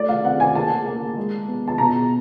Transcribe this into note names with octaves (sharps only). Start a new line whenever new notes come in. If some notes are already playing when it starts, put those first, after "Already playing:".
Already playing: A3 D5
F5
C4 F#5
G#5
A#3 A5
A#3
G#3
B3
A5
B2 A#5